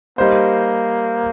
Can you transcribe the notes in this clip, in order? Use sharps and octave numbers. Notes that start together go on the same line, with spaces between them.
G3 A#3 D#4 C5